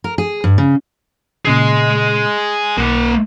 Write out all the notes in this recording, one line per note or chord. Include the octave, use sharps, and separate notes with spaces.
A#4
G#4
G2
C#3
A#2 C#3 G#4 D#5 C7
B1 A#3 F#5